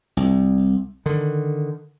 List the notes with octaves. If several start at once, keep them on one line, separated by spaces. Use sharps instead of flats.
C2
D3 D#3